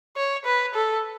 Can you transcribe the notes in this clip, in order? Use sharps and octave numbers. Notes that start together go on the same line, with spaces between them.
C#5
B4
A4